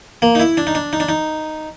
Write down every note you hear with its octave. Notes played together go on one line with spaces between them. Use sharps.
A#3
D#4
E4
D4
D#4
D4
D#4
D4
D#4